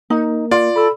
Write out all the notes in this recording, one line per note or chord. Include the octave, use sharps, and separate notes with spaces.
A#3 D#4 A#4
F4 D5
A4 B5 E6